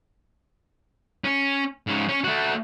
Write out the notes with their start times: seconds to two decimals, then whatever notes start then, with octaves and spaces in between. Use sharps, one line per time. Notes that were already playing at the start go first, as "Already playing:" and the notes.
1.24 C#4
1.87 G#2 C#4
2.09 C#4
2.24 A3 F#4